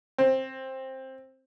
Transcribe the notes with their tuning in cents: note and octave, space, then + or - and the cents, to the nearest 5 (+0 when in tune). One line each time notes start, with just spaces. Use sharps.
C4 +15